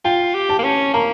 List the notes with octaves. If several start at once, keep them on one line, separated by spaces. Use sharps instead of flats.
F4 G5
G4
A5
A#3
C#4
A#3 A#5